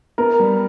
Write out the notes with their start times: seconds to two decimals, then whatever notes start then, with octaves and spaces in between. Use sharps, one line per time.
0.18 B3 A#4
0.40 G3